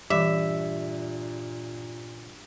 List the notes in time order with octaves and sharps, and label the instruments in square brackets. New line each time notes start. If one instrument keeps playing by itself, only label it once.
[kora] G2 [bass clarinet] A#2 [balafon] E3 D6 [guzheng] E5